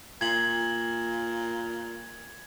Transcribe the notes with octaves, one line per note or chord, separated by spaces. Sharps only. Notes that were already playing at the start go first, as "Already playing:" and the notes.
A#2 G#6 F#7